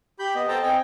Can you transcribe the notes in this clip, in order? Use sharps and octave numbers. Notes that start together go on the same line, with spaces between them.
G4 B5 G6
B3 D#5
A4 C5 G5 A5 A#5
C4 D#5 G5 G#5